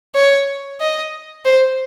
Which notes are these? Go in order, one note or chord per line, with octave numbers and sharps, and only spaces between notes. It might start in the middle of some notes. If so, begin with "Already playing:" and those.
C#5
D#5
C5